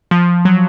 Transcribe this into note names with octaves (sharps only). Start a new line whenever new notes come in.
F3
F#3